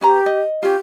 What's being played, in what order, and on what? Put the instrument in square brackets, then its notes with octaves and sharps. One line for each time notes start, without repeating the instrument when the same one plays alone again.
[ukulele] C#4 B4 A#5 [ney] G4
[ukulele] D#5
[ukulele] C#4 F4 [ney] G4